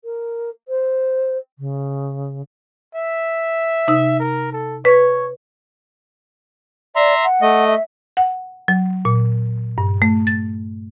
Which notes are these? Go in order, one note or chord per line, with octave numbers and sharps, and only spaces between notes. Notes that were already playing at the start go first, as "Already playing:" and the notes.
A#4
C5
C#3
E5
C3 D#4 E6
A#4
A4
B4 C#5
D5 E5 A#5 C6
F#5
A3 D#5
E5
F#5
F#3
A#2
G2
A3
A6